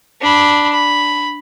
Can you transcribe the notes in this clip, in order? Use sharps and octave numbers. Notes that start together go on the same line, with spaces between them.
D4 B5
B5